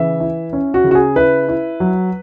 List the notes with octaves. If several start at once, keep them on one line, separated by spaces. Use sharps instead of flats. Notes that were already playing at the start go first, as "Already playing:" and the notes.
Already playing: C#3 E3 E5
E4
C#4
F#4
C#3
F#4
G#4
E4 B4
E4
F#3